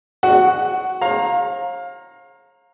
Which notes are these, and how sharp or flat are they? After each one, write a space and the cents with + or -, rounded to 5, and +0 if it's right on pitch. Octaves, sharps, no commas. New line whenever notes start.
F#4 +0 D#5 -45 F#5 +20
C#5 -45 F5 +20 A#5 +0